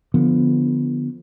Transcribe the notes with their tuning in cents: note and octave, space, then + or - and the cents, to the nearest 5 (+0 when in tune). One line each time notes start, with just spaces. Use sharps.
D3 +5 F3 +0 B3 +0